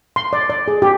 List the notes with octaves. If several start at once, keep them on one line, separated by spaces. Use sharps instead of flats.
C6
D5
D5
G#4
G4